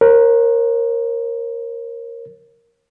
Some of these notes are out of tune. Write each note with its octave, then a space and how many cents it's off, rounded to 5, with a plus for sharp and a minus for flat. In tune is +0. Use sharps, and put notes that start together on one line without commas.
A#4 +0 C#5 -45